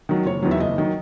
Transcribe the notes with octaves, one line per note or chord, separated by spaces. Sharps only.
D#3 F#3
F#1 C#5
E2 D#3 F#3
E5
F#1 D#5
D#3 F#3